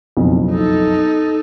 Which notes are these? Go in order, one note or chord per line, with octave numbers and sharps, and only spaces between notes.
F#1 B1 F2
D#4 A4